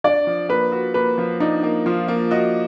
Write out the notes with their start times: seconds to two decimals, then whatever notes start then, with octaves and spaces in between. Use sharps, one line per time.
0.04 D4 D5
0.27 F3
0.49 A#3 B4
0.72 F#4
0.94 A#3 B4
1.18 F3
1.40 D4 D#4
1.63 A#3
1.86 F3 F4
2.08 A#3
2.31 F#4 D#5